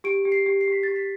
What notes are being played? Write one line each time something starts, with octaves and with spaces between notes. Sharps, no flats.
G4 D7
G4
C7
G4
C7
G4 B6
G4 A6
B6